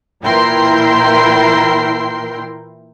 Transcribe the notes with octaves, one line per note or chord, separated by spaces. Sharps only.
A#2 E3 E4 A#4 G5 C6